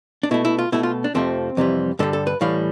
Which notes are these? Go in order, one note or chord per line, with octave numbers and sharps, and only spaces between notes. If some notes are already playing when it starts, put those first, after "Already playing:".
D4
B2 A3 E4
E4
F4
B2 A3 E4
F4
D4
F2 C3 F3 A3 C4
F2 C3 E3 G3
G2 D3 G3 A4
A4
B4
A2 E3 G3 F5